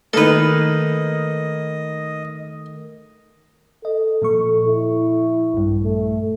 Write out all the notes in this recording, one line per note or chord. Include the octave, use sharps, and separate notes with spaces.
D#3 A3 A#3 D#4 A4 B4 D#5
A4 D#5
A#2 F3 C#6
E4
A#1 G2
A3